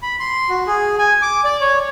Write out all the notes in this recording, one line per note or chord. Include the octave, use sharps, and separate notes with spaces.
B5
C6
F#4
G#4
G#5
D6
D5
C#5